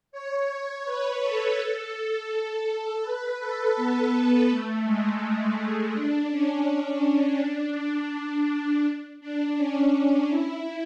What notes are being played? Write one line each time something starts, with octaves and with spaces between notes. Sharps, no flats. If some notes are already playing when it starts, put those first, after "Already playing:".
C#5
C#5
B4
A4
B4
A4
B3
A3
G#3
D4
C#4
D4
D4
C#4
D4
E4